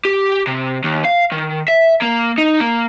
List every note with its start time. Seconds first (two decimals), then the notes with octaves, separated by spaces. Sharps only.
0.05 G4
0.47 C3
0.84 D#2
1.05 F5
1.32 D#3
1.68 E5
2.02 A#3
2.38 D#4
2.60 A#3